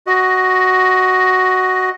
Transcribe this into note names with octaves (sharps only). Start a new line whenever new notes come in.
F#4 D#5